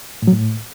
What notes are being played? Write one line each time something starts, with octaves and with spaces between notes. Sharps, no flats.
A2
F#3
A2